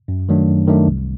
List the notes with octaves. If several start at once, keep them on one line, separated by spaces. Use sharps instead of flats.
F#2
D#3 F#3 A3 D4
F#2
D#3 F#3 A3 D4
C2